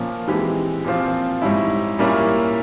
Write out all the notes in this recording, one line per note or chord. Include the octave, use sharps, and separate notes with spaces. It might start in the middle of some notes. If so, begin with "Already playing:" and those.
Already playing: A#2 F3 A#3 C#4
E3 G#3 C4 G4
A#2 F3 C4 F4
G#2 G3 C#4 E4
A#2 G3 A#3 C#4 E4